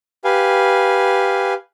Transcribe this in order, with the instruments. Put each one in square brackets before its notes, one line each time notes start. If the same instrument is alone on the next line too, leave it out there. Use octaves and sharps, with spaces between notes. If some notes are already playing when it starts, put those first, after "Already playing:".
[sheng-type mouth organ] G4 B4 F5 G#5